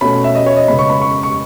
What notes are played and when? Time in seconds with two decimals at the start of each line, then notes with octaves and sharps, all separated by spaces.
0.01 B2 A3 C#4 B5
0.24 E5
0.35 D#5
0.46 C#5
0.56 D#5
0.68 C#3 G#3 B3 B5
0.79 C#6
0.90 B5
1.01 C#6
1.23 C#6